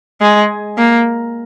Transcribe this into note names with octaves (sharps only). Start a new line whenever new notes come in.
G#3
A#3